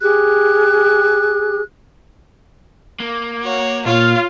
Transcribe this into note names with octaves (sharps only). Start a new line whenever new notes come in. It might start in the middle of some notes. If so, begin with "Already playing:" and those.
G4 G#4 F#6
A#3
F#4 C#5
A#2 F4 C#5 F5